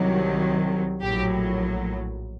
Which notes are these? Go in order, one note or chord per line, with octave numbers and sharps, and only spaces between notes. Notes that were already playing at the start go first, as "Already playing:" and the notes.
Already playing: C2 C3 D#3 F#3
A#1 A2 F#3 G4